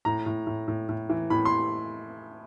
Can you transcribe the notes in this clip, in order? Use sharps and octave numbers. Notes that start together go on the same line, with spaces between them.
A2 A#5
A2
A2
A2
A2
E3
A2 B5
C6